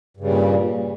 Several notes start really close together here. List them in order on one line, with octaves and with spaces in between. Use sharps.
G2 C#3 G3 A#2